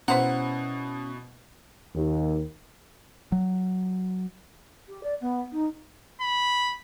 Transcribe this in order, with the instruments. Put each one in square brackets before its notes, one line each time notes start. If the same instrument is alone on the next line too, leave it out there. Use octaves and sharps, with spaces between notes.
[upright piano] B2 E4 [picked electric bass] C#4 [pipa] B4 C5 A#5 [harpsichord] F#5
[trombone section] D#2
[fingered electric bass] F#3
[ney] G4
D5
B3
D#4
[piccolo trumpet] B5